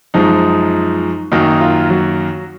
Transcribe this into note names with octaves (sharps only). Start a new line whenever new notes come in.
F#2 F3 G#3 D#4
F#2 D#3 F#3 A#3 D#4
F4
F#3 F#4